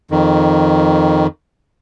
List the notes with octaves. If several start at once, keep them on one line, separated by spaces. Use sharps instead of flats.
F2 D#3